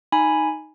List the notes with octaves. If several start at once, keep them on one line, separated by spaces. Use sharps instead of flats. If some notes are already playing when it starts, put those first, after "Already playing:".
D#4 G#5 B5